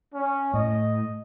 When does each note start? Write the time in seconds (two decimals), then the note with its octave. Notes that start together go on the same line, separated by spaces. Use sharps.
0.14 C#4
0.54 A2 D#5